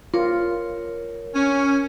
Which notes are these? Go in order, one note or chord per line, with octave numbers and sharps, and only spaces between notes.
F4 A#4 C#5
C#4